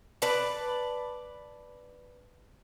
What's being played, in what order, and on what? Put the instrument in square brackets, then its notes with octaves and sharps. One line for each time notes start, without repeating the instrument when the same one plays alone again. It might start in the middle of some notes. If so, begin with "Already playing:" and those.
[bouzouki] B4 D5 A5